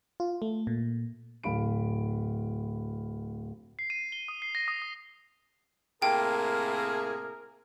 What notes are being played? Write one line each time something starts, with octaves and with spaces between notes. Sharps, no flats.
F4
A3
A#2
D1 F5 B5 D7
C7
D#7
G7
D#6
C7
A#6
D#6
D#6
A2 C3 A#3 G#4 A#4 G5